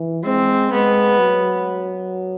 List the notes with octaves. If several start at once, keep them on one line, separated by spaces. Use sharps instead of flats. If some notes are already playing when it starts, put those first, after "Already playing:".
Already playing: E3
G#3 C4
G#3 B3
F#3